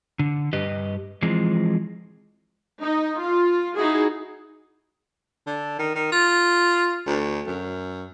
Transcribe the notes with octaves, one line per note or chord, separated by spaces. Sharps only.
D3
G2 G4 B4 D#5
E3 F3 G#3 C4
D#4
F4
D#4 E4 F#4 G#4
D3
D#3
D#3
F4
D2
F#2